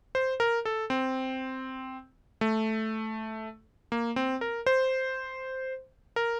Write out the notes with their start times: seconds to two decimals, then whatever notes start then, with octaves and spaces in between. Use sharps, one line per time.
0.15 C5
0.40 A#4
0.65 A4
0.90 C4
2.41 A3
3.92 A#3
4.16 C4
4.41 A#4
4.66 C5
6.16 A#4